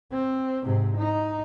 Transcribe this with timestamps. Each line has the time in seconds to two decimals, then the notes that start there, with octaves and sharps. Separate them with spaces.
0.12 C4
0.65 G#2 C3
0.97 D#4